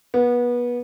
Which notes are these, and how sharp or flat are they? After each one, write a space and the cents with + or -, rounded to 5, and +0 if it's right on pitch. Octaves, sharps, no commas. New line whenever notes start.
B3 -25